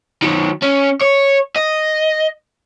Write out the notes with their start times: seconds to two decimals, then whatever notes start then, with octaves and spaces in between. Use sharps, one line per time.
0.23 D#3 F#3
0.63 C#4
1.01 C#5
1.56 D#5